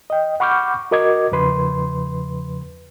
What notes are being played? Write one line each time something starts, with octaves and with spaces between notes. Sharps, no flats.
D#5 G5
F#5 B5 C#6 D6 F6 G6
F#4 A#4 D#5 D6 G#6
E2 C#3 F3 B4 C6